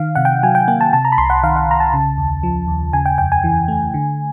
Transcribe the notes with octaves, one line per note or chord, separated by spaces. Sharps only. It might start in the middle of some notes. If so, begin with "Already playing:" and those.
Already playing: D#3 F5
C3 F#5
G5
F#3 G#5
G5
A#3 G5
A5
C3 A5
A#5
B5
C2 C6
F#5
D#3 F5
F#5
C2 A#5
A5
C#3
D#2
F3
D#2
C#3 G#5
G5
F2 G5
G#5
E3
A3
D3